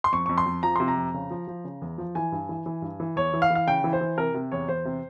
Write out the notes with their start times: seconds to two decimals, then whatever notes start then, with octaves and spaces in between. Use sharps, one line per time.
0.04 C6
0.12 F2 C#6
0.26 F2 C#6
0.38 C6
0.46 F2
0.63 F3 A#5
0.76 C3 C6
0.88 A#5
0.97 F2
1.14 C#3
1.31 F3
1.48 F3
1.64 C#3
1.82 E2
1.98 F3
2.15 E3 G#5
2.32 G2
2.49 E3
2.66 E3
2.82 G2
3.00 E3
3.16 E2 C#5
3.33 E3
3.42 F5
3.50 E3
3.55 F5
3.67 C#3 G5
3.84 E3
3.93 C5
4.01 E3
4.18 C3 A#4
4.34 C3
4.52 E2 C#5
4.68 E2 C5
4.85 C3